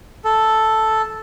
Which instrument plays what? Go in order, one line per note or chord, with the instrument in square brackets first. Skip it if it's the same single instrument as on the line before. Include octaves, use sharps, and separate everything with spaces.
[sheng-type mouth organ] A4